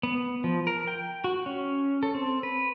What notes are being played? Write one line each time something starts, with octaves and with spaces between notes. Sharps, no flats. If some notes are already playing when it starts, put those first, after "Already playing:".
B3
F3
A#4
G5
F#4
C#4
A4
C4
B4